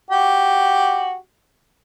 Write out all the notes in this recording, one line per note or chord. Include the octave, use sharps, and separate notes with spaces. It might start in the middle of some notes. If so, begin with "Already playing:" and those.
F#4 G4